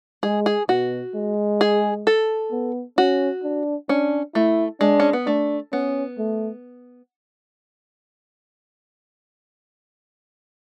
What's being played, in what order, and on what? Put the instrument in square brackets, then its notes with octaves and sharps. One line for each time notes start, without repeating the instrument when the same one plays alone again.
[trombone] G#3 [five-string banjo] G#4
[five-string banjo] G#4
[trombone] B2 [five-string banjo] F#4
[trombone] G#3
[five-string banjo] G#4
A4
[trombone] B3
[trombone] C#4 [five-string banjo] F#4
[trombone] D4
[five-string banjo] C#4 [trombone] D4
[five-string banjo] A3 [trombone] E4
[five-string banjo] G#3 [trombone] D4
[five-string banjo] C#4
B3
[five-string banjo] A3 [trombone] D4
[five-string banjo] B3 [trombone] C#4
[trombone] A3